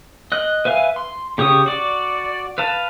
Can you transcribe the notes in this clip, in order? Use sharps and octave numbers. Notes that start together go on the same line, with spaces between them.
D#5 F#6
B4 E5 F5 G#5
C6
C#3 G4 C#5 D#6
F#4 D5
B4 F5 A5